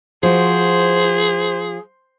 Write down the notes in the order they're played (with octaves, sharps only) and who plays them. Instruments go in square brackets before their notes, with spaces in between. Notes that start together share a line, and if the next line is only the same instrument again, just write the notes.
[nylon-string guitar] F3 F#4 [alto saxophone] G#4 [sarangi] C5